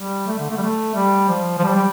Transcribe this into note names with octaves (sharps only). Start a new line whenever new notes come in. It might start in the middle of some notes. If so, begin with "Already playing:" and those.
Already playing: G3
A3
D3
A3
G3
A3
G3
F3
F3
G3
G3